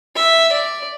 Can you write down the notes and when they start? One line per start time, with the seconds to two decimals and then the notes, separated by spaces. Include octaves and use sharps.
0.16 E5
0.52 D5